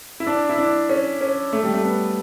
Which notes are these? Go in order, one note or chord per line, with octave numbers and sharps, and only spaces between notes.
E4
D4
E4
D4
C#4
C#4
A3
G3
A3
B3